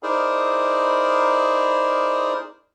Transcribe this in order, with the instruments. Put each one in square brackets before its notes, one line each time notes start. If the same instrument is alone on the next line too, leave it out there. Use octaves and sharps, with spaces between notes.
[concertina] D#4 E4 G#4 A#4 C5 D5